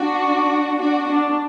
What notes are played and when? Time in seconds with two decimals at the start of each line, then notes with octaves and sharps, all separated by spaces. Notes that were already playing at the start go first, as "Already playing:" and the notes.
Already playing: D4 F#4
0.80 D4 F#4
1.08 D4